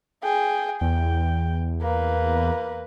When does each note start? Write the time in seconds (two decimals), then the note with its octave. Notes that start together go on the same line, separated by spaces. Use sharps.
0.23 G#4 G5
0.81 E2 G5
1.82 A#3 B4